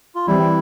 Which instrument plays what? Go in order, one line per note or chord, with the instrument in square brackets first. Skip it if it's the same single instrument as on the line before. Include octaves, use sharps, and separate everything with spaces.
[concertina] F4
[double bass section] E3 G3 C4 [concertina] E4